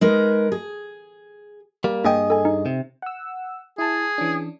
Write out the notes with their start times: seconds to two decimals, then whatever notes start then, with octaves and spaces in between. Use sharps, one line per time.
0.01 G#3 D#4 A#4 B4
0.52 G#4
1.84 G3 A#3
2.05 G2 A#3 G#4 D#5 G5
2.30 A4 G#5
2.45 D#4
2.66 C3
3.02 F#5 E6
3.78 E4 G#4 A5
4.18 E3 C#4 D4